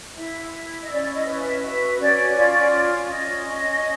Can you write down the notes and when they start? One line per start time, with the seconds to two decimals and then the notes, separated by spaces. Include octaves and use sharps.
0.16 E4 E5
0.53 E4
0.82 D#5
0.90 C#4 D5
1.14 D#5
1.26 B4
1.39 E5
1.62 F#4 E5
2.00 C#4 D5
2.36 F4 D5
2.73 C#4
3.09 C#4 D#5
3.47 C#4